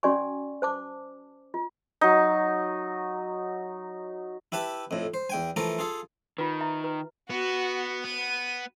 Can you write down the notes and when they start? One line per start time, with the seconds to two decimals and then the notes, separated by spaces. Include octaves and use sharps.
0.03 C#4 F#4 D5 G#5 C#6
0.62 C5 A5 D6
1.54 F4
2.01 F#3 D#4
4.52 E4 G4 B4 E5 A5
4.91 F2 A2
5.14 C5
5.30 E2 G5 G#5
5.56 E3 F3 A3 A4 A#4
5.79 F4 G#4 A4
6.38 D#3 F4 B4
6.61 E5 A#5
6.84 B4
7.30 B3 F#4
8.05 B3 D#7